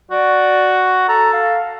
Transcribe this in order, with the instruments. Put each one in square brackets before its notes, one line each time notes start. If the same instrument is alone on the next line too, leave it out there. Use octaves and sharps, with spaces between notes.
[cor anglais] F#4 [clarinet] D5
[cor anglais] A4 [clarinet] A#5
[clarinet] F5